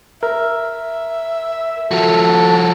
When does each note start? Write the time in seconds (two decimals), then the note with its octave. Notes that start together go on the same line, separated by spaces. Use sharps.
0.23 A#4 E5
1.91 F3 F#4 A4